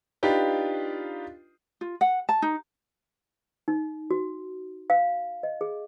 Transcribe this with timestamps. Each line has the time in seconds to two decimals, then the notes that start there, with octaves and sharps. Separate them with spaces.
0.23 D4 D#4 F4 G4 B4
1.81 F4
2.01 F#5
2.29 A5
2.42 D#4
3.68 D#4
4.11 F#4
4.90 F5
5.43 D#5
5.61 G#4